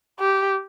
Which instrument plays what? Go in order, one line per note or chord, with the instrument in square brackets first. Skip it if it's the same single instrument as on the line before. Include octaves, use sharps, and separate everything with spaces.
[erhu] G4